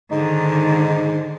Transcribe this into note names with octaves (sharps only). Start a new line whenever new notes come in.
G#2 D3 D#3 D#4